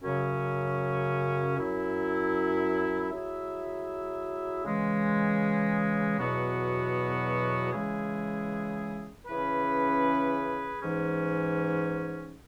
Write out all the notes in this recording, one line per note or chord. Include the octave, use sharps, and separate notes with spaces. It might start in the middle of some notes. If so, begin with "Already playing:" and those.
F#2 C#3 F#3 C#4
F#2 F#3 E4
F#3 E4 G#4 E5
C#3 E3 G#3
E2 B2 F#3 B3 F#4
C#3 E3 G#3 E4 G#4
C#3 E3 C#4 G#4 B4
G#2 E3 C#4